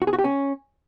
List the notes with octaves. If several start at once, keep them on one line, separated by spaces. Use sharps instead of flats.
F#4
G#4
F#4
G4
C#4